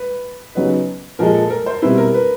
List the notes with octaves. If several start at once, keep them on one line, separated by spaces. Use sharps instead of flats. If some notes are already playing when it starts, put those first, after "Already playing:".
Already playing: B4
C#3 F#3 B3 D#4 B4
A#2 F3 G#3 A#4
A4
A4
A#4
C5
B2 G3 C4 E4 B4
A#4
B4